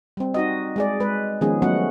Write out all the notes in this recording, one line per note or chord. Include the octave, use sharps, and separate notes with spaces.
G3 C4
D#4 F#4 D#5
G#3 G#4 D5
G#3 B4
D#3 F3 G#3 B3 C#4 G#4
F#3 A3 B3 C#4 F#4 F#5